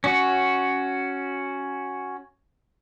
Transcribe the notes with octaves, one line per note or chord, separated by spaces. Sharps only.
C#4 F#4